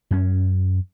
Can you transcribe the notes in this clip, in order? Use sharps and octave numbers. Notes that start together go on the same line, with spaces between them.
F#2 C#4